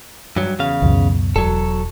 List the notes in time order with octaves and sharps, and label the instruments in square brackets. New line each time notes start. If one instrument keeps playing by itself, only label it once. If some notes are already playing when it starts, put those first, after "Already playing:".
[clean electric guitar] G2 F#3
E2 C#3 F5
[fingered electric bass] C#2 F#2 B2
[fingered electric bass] E1 [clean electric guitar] F#3 A4